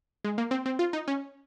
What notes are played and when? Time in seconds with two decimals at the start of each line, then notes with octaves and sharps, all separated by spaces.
0.24 G#3
0.38 A#3
0.51 C4
0.66 C4
0.79 F4
0.93 D#4
1.08 C#4